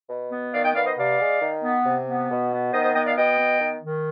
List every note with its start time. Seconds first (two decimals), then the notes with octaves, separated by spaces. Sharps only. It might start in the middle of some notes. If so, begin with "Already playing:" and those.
0.10 B2
0.32 B3
0.54 D#3 D5 F5
0.65 D#5 G5
0.75 B3 D5 F5
0.86 C5 D#5
0.97 C3 D5 F5
1.20 G#3
1.42 D#3
1.64 B3
1.85 C3
2.07 B3
2.30 B2
2.52 B3
2.73 D#3 C5 D#5
2.84 C5 D#5
2.95 B3 D#5 G5
3.06 D5 F5
3.17 B2 D#5 G5
3.39 B3
3.61 D#3
3.83 D#3